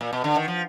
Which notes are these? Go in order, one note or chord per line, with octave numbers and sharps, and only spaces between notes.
A#2
B2
D3
D#3
F3